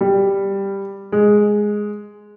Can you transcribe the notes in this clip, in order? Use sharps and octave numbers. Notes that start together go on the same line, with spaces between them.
G3
G#3